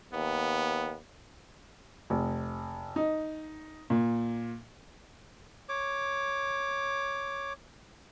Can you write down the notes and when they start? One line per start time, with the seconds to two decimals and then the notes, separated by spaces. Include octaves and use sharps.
0.14 D#2 B3
2.10 F1
2.96 D#4
3.90 A#2
5.69 C#5 D6